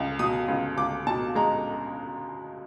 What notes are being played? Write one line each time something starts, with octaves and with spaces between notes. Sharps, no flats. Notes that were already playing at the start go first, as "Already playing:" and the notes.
Already playing: C#2
B2 D#6
C#2
C#2 D6
B2 A5
G#3 A#5